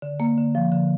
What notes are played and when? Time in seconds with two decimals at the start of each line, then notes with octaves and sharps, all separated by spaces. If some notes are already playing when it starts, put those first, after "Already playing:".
0.02 D3
0.20 A#3
0.38 D3
0.55 F3
0.72 D3